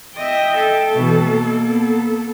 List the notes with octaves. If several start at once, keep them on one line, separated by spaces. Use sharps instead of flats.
D#5 E5 G5
A4
B2 E3
A#3
B3 A4